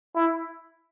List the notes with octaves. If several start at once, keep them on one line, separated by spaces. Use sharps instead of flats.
E4